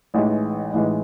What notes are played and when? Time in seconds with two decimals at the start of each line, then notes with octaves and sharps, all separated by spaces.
0.14 A1 A2 E3 G#3 D#4
0.73 A1 A2 E3 G#3 D#4